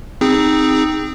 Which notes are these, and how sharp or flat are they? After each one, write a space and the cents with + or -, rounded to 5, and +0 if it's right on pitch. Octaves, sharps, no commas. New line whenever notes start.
C4 +0 D#4 +0 G#4 -25